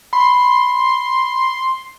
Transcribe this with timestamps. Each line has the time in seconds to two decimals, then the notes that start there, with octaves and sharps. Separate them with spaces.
0.13 B5 C6